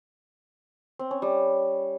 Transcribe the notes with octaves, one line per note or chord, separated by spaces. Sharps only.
C4
C#4
G3